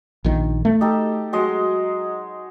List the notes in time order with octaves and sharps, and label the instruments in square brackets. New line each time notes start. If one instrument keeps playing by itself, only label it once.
[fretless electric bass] A#1 D#3
A3
[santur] D#4 G4 A4
F#3 G#3 D#5